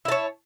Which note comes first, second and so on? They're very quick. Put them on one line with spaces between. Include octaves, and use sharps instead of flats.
E4 A5 C#5